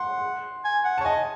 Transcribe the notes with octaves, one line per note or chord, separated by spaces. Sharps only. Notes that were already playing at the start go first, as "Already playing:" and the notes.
Already playing: F#5 C6
G#5
F#5
A5
C#5
D#5 G#5